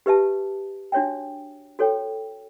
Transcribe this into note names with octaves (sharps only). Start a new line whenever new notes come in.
G4 B4 E5 A5
D4 F#4 C#5 E5 G5
F#4 A4 C#5 G5